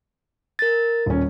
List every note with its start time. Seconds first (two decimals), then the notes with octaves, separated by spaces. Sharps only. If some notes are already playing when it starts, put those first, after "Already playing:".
0.59 A#4 A6
1.06 D#1 C#4